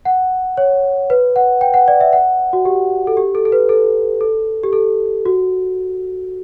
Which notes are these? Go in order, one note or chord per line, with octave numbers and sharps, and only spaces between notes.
F#5
C#5
B4
F#5
G5
F#5
D5
E5
F#5
F#4
G4
A4
G4
A4
A4
B4
A4
A4
G4
A4
F#4